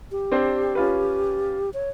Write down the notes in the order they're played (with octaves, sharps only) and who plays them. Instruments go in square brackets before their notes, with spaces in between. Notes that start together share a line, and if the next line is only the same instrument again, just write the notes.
[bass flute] G4
[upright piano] C4 D4 C5
C#4 F4 B4
[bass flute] C#5